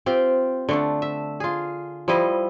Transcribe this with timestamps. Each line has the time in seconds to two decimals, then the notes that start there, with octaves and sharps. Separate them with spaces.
0.06 C4 F4 G4
0.69 D3 A3 D4
1.02 E5
1.40 F4 G#4
2.08 F3 G3 E4 D#5